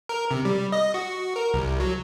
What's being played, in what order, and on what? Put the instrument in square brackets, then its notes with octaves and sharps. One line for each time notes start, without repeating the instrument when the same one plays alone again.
[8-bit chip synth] A#4
C3
G3
D#5
F#4
A#4
C2
F#3